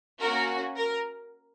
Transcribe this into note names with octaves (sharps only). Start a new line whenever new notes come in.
A#3 C#4 F#4 A#4
A#4